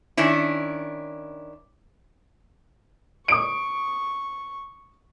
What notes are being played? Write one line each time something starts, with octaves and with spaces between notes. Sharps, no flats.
D#3 C#4 D4 E4
C#6 D#6 D7